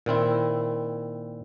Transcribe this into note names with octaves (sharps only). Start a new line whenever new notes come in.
A#2 D#3 C4 E4